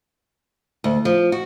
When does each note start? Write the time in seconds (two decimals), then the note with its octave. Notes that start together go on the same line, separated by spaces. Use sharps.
0.84 D2
1.05 F3
1.32 F#4